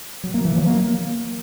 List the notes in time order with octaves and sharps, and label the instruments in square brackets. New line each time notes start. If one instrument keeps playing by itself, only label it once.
[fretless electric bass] F#3
A#3
E3
F#3
A#3